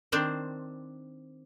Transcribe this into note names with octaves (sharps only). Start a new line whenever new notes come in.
D#3 C4 D4 C5